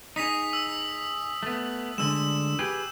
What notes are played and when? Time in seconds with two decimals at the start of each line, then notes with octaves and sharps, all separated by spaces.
0.16 D#4 G#4 D#6 B6 F7
0.53 E6
1.43 A3 B3
1.98 D2 D3 G#3 E6 E7
2.59 G4 G#4 B4